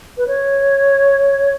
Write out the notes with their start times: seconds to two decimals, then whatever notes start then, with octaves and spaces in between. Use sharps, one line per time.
0.18 B4
0.27 C#5